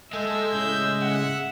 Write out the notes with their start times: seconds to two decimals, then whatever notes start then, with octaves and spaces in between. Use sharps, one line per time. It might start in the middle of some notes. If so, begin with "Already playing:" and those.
0.13 G#3 A4 E5 E6 G6
0.52 A2 C#3 G6
1.02 F#5